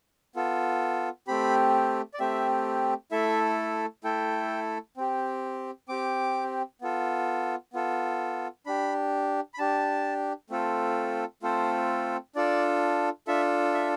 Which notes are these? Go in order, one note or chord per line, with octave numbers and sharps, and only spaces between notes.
B3 F4 A4
A3 C4 G4 B5
D5
A3 C4 G4 E5
A3 E4 A4 E5
A3 E4 A4 G5
C4 G4
C4 G4 D6
B3 F4 A4
B3 F4 A4
D4 G4 B5
B5
D4 G4 A5
A3 C4 F4 A4
A3 C4 F4 A4 C5
D4 F4 A4 D5
D4 F4 A4 E5
E5